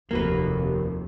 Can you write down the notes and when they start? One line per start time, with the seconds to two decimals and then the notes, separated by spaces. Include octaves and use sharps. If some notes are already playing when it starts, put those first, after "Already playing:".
0.11 F1 D#2 A#3 F#4 B4